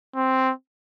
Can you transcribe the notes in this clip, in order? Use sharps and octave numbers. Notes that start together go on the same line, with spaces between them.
C4